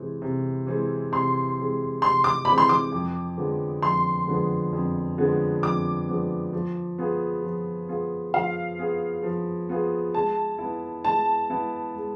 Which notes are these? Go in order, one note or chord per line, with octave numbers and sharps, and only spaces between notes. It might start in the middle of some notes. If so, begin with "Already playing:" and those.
Already playing: C3 E3 G#3 C4
C3
E3 G#3 C4
C3 C6
E3 G#3 C4
C3 C6
D6
E3 G#3 C4 B5
C6
D6
F2
D3 F3 G#3 B3
F2 C6
D3 F3 G#3 B3
F2
D3 F3 G#3 B3
F2 D6
D3 F3 G#3 B3
F3
B3 F4 G#4
F3
B3 F4 G#4
F3 F5
B3 F4 G#4
F3
B3 F4 G#4
G#3 A5
B3 E4
G#3 A5
B3 E4
G#3